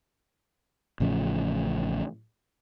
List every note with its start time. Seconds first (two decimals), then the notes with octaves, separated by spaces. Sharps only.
1.00 A1 A2 C#3 F3